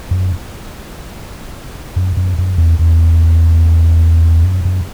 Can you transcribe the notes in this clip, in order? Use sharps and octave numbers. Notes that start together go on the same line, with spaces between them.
F#2
F#2
F#2
F#2
E2
E2
F#2
F#2